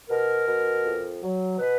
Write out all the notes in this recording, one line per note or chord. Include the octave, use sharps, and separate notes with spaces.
B2 A#4
B2
F2
F#3
B2 B4